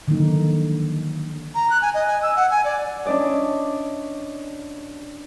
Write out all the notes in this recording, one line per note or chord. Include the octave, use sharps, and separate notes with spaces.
D3 D#3 F3 F#3 A#3 D#4
A#5
F#6
G#5
D#5
G#5
E6
F#5
G#5
D5
C#4 D4 E4 D5 D#5